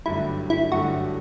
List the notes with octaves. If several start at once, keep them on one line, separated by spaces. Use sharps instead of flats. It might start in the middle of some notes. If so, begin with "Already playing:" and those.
G2 D3 F#3 A3 E4
E4
G2 D3 F#3 A3 F#4